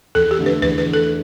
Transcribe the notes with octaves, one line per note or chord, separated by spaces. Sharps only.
E2 A4
G4
D3 A3
B4
E2 B4
B4
D3 A3
A4